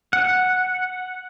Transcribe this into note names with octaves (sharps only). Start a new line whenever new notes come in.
F#5